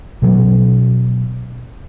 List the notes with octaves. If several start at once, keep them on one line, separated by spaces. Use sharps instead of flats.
B2 F#3 C#4